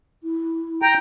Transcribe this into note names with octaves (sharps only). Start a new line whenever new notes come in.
E4
G5 A#5